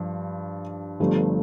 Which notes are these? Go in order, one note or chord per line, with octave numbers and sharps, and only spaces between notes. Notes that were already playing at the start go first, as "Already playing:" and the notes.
Already playing: G2 F3
G1 G2 F3 A3